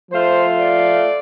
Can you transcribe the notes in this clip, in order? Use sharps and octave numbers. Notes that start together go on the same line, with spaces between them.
F3 A3 F4 C5
D5